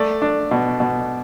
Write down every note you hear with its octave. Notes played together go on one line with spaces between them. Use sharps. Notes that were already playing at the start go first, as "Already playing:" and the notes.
Already playing: A3 D5
D4
B2
B2